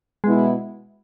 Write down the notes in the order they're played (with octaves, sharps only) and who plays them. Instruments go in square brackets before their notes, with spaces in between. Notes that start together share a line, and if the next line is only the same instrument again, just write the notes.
[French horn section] B2 B3 E4 [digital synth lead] G#3